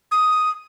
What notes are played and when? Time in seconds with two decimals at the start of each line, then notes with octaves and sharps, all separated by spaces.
0.12 D#6